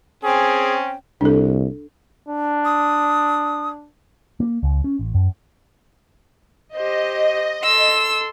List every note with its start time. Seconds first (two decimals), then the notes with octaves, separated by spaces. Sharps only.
0.24 C4 C#4 G#4 G5
1.21 C2 D4 A4
2.28 D4
2.65 D#6
4.40 A#3
4.63 C#2
4.84 C#4
4.99 A1
5.14 F#2
6.76 G4 C5 D#5
7.64 A4 C6 E6